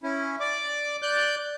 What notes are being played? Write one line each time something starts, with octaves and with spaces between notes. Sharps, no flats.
C#4 E4
D5 D6
D5 F#6 G6